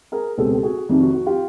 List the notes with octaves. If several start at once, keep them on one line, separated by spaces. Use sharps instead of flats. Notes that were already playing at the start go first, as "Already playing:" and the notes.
G#4 A#4
C#2 B2 G#3 C4 G4 A4
G4
F#4 G#4
F1 F2 C3 D#3
F#4
F#4
F4 G4